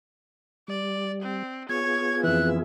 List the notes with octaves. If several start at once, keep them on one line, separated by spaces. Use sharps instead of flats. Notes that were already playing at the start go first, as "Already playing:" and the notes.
G3 D5
C4
B3 F4 G#4 C#5 G#6
F2 E3 E5 F#6